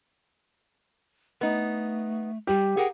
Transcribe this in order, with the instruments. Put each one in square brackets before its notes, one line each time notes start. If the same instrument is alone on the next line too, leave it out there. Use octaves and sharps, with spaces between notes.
[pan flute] A3 [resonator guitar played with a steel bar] B3 D#4
[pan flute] G3 [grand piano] G4
[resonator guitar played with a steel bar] G#4 A#4 G5 [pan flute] F#5